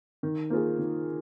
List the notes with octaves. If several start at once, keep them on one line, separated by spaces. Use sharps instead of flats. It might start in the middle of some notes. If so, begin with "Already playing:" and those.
D#3
A#3 F4 G#4
D#3